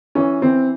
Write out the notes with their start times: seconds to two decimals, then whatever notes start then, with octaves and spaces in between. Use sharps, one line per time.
0.15 E3 C#4
0.42 E3 C4